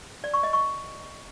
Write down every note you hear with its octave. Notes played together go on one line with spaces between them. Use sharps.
D5
C#6
D#5
C#6